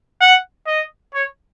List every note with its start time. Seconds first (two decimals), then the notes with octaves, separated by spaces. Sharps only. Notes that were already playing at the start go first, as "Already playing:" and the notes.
0.21 F#5
0.67 D#5
1.14 C#5